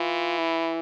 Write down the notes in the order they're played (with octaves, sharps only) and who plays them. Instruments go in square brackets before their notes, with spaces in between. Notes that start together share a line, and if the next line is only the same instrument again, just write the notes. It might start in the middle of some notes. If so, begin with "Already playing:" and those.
Already playing: [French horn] E3 [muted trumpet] F4
[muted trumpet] E4